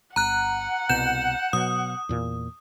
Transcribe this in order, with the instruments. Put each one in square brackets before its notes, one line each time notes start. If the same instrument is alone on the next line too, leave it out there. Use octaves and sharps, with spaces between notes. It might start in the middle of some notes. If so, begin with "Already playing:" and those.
[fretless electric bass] G1 [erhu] F#5 [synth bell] A#5 F#6
[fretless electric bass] C2 B2 [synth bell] G6 E7
[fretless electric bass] B2 F#3 [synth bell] D#6
[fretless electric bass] E2 A#2